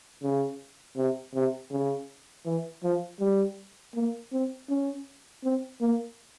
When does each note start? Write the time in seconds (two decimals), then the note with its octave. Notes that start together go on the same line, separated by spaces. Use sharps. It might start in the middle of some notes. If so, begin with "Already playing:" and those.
0.22 C#3
0.97 C3
1.34 C3
1.71 C#3
2.45 E3
2.83 F3
3.20 G3
3.95 A#3
4.32 C4
4.70 C#4
5.43 C4
5.81 A#3